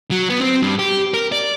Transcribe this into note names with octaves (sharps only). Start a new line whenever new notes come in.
F#3
B3
C4
G2
G4
A#4
D5